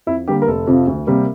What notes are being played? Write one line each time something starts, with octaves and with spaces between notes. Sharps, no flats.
F2 E4
D3 G3 A#3 G4
A#4
F1 A4
F2 C3 F3
D2
C3 G3 A#3